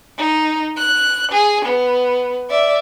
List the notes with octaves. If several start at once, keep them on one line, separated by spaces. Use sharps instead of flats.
D#4
F#6
G#4
B3
D5 E5